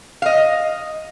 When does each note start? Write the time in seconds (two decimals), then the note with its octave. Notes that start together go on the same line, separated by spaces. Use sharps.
0.22 D#5 F5